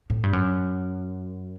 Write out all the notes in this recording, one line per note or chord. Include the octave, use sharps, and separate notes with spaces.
A2
G2
F#2